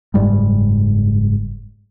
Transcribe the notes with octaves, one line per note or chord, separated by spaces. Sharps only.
F#1 G#2 G3 G#3